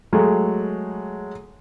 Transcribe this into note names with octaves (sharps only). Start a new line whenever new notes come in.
F#3 G#3 A3